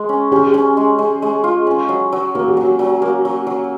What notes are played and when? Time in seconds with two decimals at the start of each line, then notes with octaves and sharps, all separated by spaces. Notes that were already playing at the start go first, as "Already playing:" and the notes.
Already playing: G#3
0.09 C#4
0.32 C#4 G4
0.39 G#4
0.46 G4
0.54 C#4
0.77 G#3
0.99 G#3
1.22 G#3
1.44 F4
1.67 C#4
1.89 F#3
2.12 F#3
2.35 A#3 F#4
2.48 G4
2.57 F#3 F#4
2.79 F#3
3.02 A#3
3.25 F#3
3.47 F#3